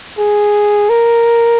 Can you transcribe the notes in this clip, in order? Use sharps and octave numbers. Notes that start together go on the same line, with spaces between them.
G#4
A#4